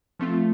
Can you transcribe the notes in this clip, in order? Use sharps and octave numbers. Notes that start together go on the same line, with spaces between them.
F3 A3 C4 F4